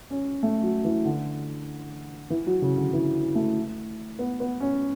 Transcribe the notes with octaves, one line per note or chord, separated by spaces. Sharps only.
C#4
A3
F#3
E3
D3
E3
F#3
C#3
D3
E3
A3
B3
B3
C#4